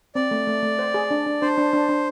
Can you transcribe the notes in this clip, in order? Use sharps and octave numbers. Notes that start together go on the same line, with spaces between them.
C4 D5
A3
A3
A3
C5
G#4
D4
D4
D4 C5
D4
D4
D4